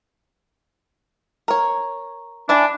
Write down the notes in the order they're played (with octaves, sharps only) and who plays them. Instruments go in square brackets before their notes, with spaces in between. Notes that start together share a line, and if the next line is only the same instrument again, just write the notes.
[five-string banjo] A#4 C#5
[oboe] D4 [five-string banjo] E4 D5 G#5